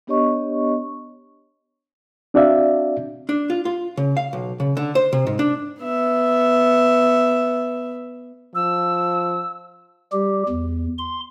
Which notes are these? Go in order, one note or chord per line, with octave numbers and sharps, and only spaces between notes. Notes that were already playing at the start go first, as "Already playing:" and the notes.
B3 D4 G4 C#5 D#5 C#6
C4 D4 F#4 D5 E5 F5
D4
F4
F4
C#3
F5
B1
C#3
D3
C5
C3
G#2
D4
B3 E5
F3 E6
G3 G4
E2
C6